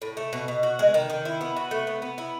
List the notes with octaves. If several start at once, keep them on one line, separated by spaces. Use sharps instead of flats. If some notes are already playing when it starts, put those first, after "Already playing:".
A2
A3
B2
B2
F#4
G#3
D#3
D#3
E4
B3
F#4
A3
B3
B3
E4